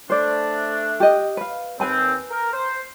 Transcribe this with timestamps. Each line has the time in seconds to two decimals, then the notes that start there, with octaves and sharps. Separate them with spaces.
0.10 A3 D4 C5 D5
1.00 G4 D#5
1.37 B4 F5
1.80 D#2 C4 B4 G#5 B5
2.31 A#4
2.53 C5